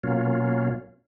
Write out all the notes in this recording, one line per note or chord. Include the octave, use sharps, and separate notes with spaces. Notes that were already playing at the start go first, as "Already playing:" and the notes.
B2 F#3 A#3 C#4 F4